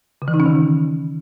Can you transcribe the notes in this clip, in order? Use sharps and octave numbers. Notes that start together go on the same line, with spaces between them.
C#3
E3
D#4
C#4
D#3